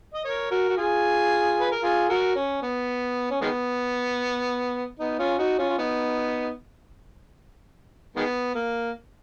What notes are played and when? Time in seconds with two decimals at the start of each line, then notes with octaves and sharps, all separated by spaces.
0.14 D#5
0.25 A#4 C#5
0.51 F#4 A#4
0.70 F#4
0.77 F4 G#4
1.61 B4
1.72 A#4
1.83 F4 G#4
2.09 F#4 A#4
2.36 C#4
2.62 B3
3.31 C#4
3.41 D#3 G#3 B3
4.99 B3 D#4
5.19 C#4 F4
5.38 D#4 F#4
5.59 C#4 F4
5.69 F4
5.79 B3 D#4
8.16 D#3 G#3 B3
8.55 A#3